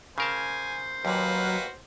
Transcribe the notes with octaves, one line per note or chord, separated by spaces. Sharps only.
C#3 A#4 C5 G#5 A5
D#2 A#2 F#3 F#4 B4 F6